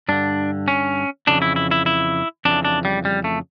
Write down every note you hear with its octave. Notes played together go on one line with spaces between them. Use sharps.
G2 D3 D4
C#4
F2 C#3 E3 D4
E4
E4
E4
E4
F2 C#3 E3 D4
D4
G3
G3
A3